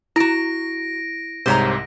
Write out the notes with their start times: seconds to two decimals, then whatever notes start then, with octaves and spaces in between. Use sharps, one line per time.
0.16 E4 F#4 A#5 A#6 D7
1.46 C2 G#2 C3 C5 C#5 A#5